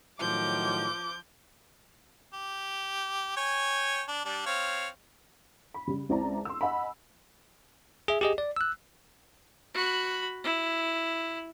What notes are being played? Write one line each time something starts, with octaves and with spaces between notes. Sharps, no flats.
A2 D#3 F3 F#3 D6 G6
G4
C#5 G5 G#5
D4
G3 D4
C4 C#5 F5
B5
C#3 G3
C#2 C4 E4 D5 A5 A#5
C6 E6
D#5 F#5 G#5 B5
G#4 E5
G4 G#4 D#5
D5
E6 F#6
F#4 B5
E4